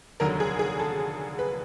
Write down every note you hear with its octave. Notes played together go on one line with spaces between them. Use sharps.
F1 D#2 D3 F#3 A#4
G#4
G#4
A4
B4